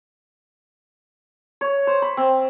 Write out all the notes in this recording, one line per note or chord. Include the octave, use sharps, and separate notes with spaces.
C#5
C5
B5
C4